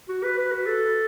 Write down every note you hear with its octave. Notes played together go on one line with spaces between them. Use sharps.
F#4
B4
B4
F#4
A4